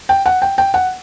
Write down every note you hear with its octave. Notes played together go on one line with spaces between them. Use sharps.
G5
F#5
G5
G5
F#5